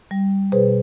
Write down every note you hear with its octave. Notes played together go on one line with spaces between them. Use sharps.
G3
B2 G#4 B4 C5